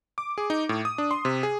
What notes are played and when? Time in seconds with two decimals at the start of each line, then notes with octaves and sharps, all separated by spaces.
0.18 D6
0.38 G#4
0.50 D#4
0.69 A2
0.85 D#6
0.98 D4
1.11 C6
1.25 C3
1.43 G#4